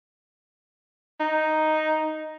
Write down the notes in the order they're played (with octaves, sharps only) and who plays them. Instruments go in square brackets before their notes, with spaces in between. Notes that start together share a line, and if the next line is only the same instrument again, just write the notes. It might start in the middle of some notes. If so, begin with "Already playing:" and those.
[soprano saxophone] D#4